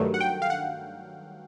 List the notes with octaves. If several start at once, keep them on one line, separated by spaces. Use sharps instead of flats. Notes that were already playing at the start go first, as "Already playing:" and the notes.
Already playing: G2 D#3 F#3 A3
F#5
G5
F5
F#5